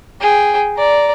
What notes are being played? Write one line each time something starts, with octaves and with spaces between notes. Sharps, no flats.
G#4 G5
D5 A#5